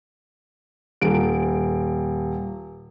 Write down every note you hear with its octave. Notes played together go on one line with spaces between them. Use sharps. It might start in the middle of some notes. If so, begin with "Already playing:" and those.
D#1 D7